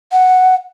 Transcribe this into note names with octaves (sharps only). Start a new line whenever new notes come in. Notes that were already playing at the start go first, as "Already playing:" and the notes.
F#5